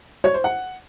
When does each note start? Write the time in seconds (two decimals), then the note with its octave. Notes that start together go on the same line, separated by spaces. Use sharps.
0.24 C#5
0.34 C5
0.44 F#5